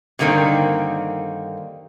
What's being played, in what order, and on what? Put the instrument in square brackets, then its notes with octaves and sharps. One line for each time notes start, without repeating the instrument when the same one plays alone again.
[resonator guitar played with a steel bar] G2 D3 D#3 A#3 C4